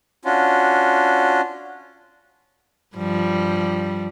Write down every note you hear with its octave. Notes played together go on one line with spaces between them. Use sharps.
C#4 D4 F4 F#4
G2 F3 G3